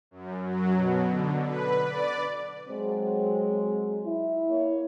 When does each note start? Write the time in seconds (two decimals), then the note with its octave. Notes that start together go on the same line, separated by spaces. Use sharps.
0.11 F#2
0.42 F#3
0.73 B2
1.09 D3
1.43 B4
1.83 D5
2.69 F#3 G#3 C4
4.06 E4
4.49 A#3 C#5